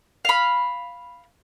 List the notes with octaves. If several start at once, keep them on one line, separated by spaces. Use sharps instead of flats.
F5 B5